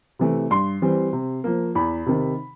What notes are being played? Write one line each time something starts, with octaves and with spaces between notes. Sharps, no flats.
C3 E3 A3
G2 C6
E3 G3 C4
C3
F3 A#3
E2 B5
C3 D#3